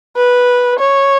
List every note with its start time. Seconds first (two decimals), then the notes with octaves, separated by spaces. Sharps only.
0.17 B4
0.79 C#5